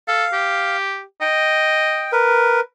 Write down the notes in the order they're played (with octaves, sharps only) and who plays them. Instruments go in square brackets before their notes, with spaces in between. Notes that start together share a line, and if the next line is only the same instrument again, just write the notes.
[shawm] A4 [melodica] F5
[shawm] G4
[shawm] D#5 [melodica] G5
[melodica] A#4 B4